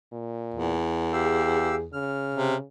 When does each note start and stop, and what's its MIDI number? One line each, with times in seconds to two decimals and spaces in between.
0.12 0.74 46
0.54 1.98 40
1.13 1.75 67
1.13 1.84 68
1.13 1.75 77
1.13 1.75 88
1.93 2.65 49
1.93 2.55 89
2.35 2.55 48